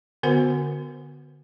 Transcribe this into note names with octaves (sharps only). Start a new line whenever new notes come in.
D3 B3 F#4 A#4 C5 F#5